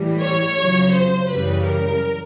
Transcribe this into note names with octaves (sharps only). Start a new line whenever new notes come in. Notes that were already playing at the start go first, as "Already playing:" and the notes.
Already playing: A2 E3 G3
C#5
F2 C#3 F#3
C5
F#2 C#3 E3 G3 B4
A#4